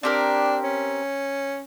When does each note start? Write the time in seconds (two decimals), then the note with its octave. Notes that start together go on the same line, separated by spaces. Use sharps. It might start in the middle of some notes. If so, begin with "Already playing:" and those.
0.03 C4 D4 G4 A#4
0.64 C#4